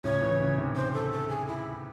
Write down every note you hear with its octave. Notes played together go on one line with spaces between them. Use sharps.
A2 C#3 C#5
C#3 E3
C#3 E3
C3 D#3
C5
A4
A4
G#4
E4